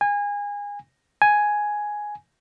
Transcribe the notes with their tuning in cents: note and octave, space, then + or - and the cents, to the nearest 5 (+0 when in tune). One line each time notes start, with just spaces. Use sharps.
G#5 -25
G#5 +5